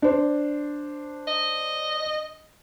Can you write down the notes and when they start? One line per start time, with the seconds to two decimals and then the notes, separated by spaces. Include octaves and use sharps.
0.02 D4 C5
1.27 D#5